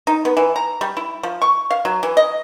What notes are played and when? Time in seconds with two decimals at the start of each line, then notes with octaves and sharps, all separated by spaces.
0.07 D#4
0.25 B3
0.37 E3
0.56 A#5
0.81 G3
0.97 E4
1.23 F3
1.42 C#6
1.71 F5
1.85 F#3
2.03 E3
2.17 D#5